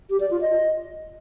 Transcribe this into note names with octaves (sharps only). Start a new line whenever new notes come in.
G4
D5
F4
D#5